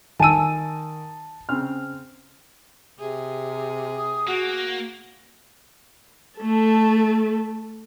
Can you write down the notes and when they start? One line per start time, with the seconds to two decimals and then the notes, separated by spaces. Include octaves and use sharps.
0.20 D#3 G#5 A5 E6 D#7
1.49 C#3 C4 F6
2.99 C3 G#4
3.98 D#6
4.27 A#3 F#4
6.39 A3 A4